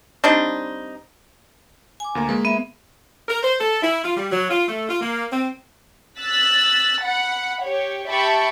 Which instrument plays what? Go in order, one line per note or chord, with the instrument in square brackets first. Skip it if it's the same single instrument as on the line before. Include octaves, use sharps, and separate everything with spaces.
[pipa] G3 C4 D4 D#4
[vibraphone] G#5 D6
[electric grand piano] D2 A#3 A#5
[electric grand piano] G#3 A#3 [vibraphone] B4
[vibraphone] B3 E5
[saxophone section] A#4
C5
A4
E4
F4
G3
F#3
F4
A3
F4
A#3
C4
[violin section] E6 F#6 A6 B6
F#5 B5
G4 C#5
G4 E5 G5 A5 B5 C#6